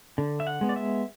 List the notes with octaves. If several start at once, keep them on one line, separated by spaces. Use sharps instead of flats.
D3
E5
F#5
G#3 B3
D5
E5